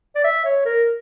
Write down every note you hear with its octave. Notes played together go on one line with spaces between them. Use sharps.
D5
E5
C#5
A#4